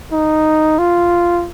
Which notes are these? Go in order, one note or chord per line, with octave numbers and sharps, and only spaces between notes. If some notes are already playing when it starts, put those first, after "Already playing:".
D#4
F4